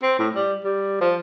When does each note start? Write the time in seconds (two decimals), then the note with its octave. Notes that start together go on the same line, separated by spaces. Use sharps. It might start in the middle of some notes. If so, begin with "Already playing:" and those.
0.02 C4
0.19 A2
0.35 G3
0.64 G3
1.01 F3